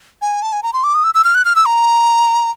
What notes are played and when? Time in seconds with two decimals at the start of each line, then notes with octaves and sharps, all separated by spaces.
0.22 G#5
0.42 A5
0.53 G#5
0.63 A#5
0.73 C6
0.84 D6
0.94 D#6
1.04 E6
1.14 E6
1.24 F6
1.35 F#6
1.45 F6
1.56 E6
1.66 A#5